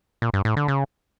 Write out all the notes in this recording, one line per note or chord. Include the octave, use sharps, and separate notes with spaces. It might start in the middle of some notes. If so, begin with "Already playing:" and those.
A#2
G2
A2
D3
C#3